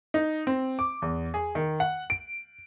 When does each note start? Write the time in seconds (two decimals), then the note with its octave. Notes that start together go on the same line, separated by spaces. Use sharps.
0.14 D#4
0.47 C4
0.79 D6
1.02 E2
1.34 G#4
1.55 D#3
1.80 F#5
2.10 D7